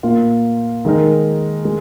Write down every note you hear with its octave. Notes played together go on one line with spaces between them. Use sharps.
A#2 A#3 F4 A#4
D#3 G#3 D#4 A#4
G#3